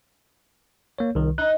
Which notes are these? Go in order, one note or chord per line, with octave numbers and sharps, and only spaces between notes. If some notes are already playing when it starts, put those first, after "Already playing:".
A#3 C#5
C2 D#3
D#4 F#6